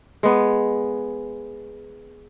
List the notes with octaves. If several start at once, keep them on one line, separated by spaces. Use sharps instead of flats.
G#3 B3